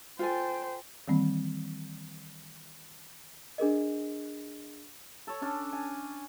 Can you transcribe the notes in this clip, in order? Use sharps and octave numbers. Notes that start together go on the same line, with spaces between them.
F4 A4 C5 G5 G#5
D#3 E3 G3 A#3 C4
D4 G#4 A#4 D#5
A4 C#5
C#4 D4 A4
G#5